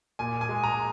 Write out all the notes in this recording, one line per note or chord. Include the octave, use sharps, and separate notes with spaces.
A#2 G#5
G#5
G#3
A#5